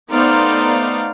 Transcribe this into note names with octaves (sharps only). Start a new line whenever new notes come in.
A3 B3 D#4 C5 D5 F5